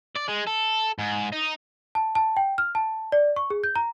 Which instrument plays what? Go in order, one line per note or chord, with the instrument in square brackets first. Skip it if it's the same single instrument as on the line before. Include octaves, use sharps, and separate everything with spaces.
[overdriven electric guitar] D5
G#3
A4
G#2
D#4
[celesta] A5
A5
G5
F6
A5
D5
C#6
G#4
G6
A#5